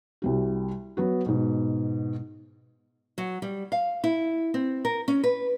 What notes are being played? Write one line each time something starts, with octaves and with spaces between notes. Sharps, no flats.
C2 G3 F#4
F#3 B3 F#4
G#2 B2
F#3
G3
F5
E4
C4
A#4
C#4
B4